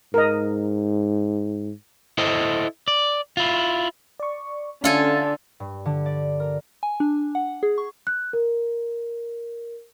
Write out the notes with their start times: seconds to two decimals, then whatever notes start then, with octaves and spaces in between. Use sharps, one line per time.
0.14 G#2 A#4 D#5
2.18 E4 A4 C5 D#5
2.88 D5
3.37 E4 F4
4.20 D5 C#6
4.84 D3 C#4 F4 A4 E5 F5 G#5
5.60 G2
5.86 D3
6.06 D5
6.40 A#4
6.83 G#5
7.00 D4
7.35 F#5
7.63 G#4
7.78 C#6
8.07 F#6
8.33 A#4